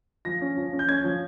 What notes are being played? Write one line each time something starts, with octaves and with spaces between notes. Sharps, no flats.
F3 A#6
C#4
F3
C#4
G6
C#4 G#6
F3